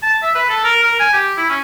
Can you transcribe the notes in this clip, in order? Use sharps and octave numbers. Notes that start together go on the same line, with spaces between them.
A5
E5
B4
A4
A#4
A#4
G#5
G4
E4
C#4